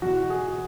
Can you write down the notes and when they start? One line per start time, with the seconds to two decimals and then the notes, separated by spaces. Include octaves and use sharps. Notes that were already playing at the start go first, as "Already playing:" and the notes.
0.02 E2 B2 F#4
0.30 G#4